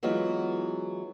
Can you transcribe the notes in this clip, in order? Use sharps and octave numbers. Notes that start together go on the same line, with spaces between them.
E3 F#3 G#3 B3 F4